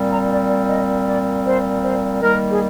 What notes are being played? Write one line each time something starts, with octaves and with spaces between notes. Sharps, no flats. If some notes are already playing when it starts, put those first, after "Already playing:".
Already playing: A#2 G3 C4
A#5
D5
D5
D#5
D5
C5
C5
D#3 G3 A#3 A#4
G#4